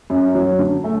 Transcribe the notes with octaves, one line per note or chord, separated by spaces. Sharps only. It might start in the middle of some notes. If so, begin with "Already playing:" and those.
F#2
F#3
D3
A3